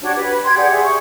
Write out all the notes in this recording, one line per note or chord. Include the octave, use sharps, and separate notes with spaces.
D4 F#4 G4 C#5
B4
G5 C6 G#6
G4 G#4 D5 F#5
G#4 E5
C#6